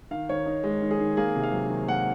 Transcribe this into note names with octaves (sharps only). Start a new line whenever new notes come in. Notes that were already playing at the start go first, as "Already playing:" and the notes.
D#3 F5
D#3 C#5
D#4
G#3
D#3
G#4
D#3
A#3 G#4
C3
F5
F#3
D#3
A#3 F#5